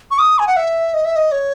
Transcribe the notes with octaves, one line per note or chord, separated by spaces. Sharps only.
C#6
D#6
G#5
F#5
E5
D#5
E5
D#5
C#5